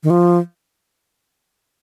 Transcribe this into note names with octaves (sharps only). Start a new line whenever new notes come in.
D#3
F3